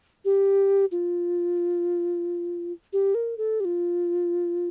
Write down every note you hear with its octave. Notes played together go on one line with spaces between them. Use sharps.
G4
F4
G4
A#4
A4
G4
F4